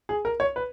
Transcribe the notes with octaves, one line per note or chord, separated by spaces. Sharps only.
G#4
A#4
C#5
B4